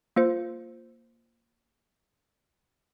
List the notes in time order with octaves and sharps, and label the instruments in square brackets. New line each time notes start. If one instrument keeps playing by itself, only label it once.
[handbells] A#3 F4 C5